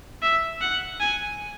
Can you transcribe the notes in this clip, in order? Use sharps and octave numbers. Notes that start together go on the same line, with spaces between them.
E5
F#5
G#5